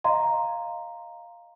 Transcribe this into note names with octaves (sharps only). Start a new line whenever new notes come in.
D#5 F5 A#5 C6